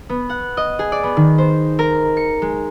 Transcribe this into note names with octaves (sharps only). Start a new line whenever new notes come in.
B3
F#5
D#5
G#4
D5
B3
D#3
C5
A#4
C#7
G#3